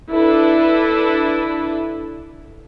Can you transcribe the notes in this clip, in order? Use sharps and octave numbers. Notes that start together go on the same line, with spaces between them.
D4 E4 A4 B4